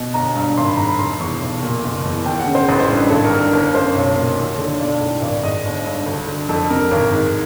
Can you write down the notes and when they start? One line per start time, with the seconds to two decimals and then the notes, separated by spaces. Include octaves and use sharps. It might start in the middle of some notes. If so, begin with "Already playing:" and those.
Already playing: B2
0.14 G1 A#5
0.35 G2
0.57 G#1 C6
0.66 B5
0.77 G#2 A#5
0.86 B5
0.99 F1 C6
1.20 E2 C#6
1.42 B1
1.63 A#2
1.84 F#1
2.05 E2
2.26 D#2 G5
2.40 F#5
2.47 C#3
2.55 C5
2.69 A1 B4
2.79 C5
2.90 G2 B4
3.10 G#1 A4
3.25 A#4
3.31 G2
3.39 A#4
3.53 G1 A#4
3.75 F#2 C5
3.95 B1 C#5
4.16 A#2
4.38 D#2
4.59 D3
4.80 B1 D5
5.01 A2
5.22 G#1 D5
5.43 G#2 D#5
5.65 G1
5.85 G2
6.06 D2
6.28 D3
6.49 F2 A4
6.70 C3 A#4
6.91 G#1 A#4
7.12 G#2